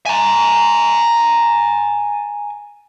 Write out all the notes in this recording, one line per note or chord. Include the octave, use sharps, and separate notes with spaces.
G#5 A#5